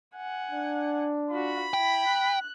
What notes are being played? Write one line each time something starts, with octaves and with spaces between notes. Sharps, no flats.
F#5 G#5
D4
F4 F#4 B5
E4 G5
F#6